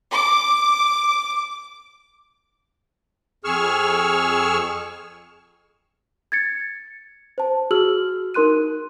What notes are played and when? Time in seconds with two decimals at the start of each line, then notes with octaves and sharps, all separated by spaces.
0.14 D6
3.44 F2 G#4 C#6 E6 F6
6.32 G#6 A6 C#7
7.38 C5 A5
7.71 F#4 G#4 E6 F6 F#7
8.34 D#4 A#4 C6 F#6 D#7